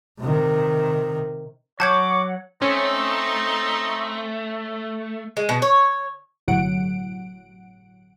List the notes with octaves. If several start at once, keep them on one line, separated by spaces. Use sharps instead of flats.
C3 D#3
F#3 C#5 F#5 A5 D6 G6 G#6
A3 C4 C#4 D#4
G#3
B2
C#5
G1 A2 C3 F#3 F#5 D7